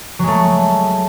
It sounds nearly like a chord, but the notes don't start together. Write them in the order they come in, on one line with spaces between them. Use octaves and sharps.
F#3 G#3 A3